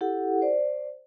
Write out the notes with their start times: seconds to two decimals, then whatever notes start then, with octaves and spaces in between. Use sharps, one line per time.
0.01 E4 G4 A4 F#5
0.42 C5 D5